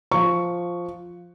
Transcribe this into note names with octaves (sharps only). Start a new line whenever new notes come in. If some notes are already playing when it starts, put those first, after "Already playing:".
F3 C#6